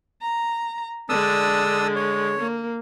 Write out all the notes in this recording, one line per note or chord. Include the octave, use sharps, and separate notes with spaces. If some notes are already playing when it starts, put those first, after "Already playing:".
A#5
D3 G#3 D4 D#6 E6
C#5
A#3